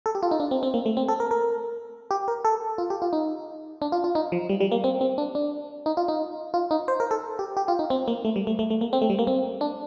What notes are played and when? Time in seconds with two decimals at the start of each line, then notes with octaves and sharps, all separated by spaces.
0.06 A4
0.15 G4
0.23 F4
0.31 D#4
0.40 D4
0.51 C4
0.63 C4
0.74 A#3
0.86 A3
0.97 C4
1.08 A4
1.20 A#4
1.31 A#4
2.11 G4
2.28 A#4
2.45 A4
2.78 F4
2.90 G4
3.02 F4
3.13 D#4
3.82 D4
3.92 F4
4.04 F4
4.15 D#4
4.32 F3
4.49 G3
4.60 G3
4.71 A#3
4.84 C4
5.01 C4
5.18 D4
5.35 D4
5.86 D#4
5.97 F4
6.08 D#4
6.54 F4
6.71 D#4
6.88 C5
7.00 A#4
7.11 A4
7.39 G4
7.57 G4
7.68 F4
7.79 D#4
7.90 C4
8.08 A#3
8.25 A3
8.36 G3
8.47 A3
8.59 A3
8.70 A3
8.81 A#3
8.93 C4
9.02 A3
9.10 G3
9.19 A#3
9.27 C4
9.61 D4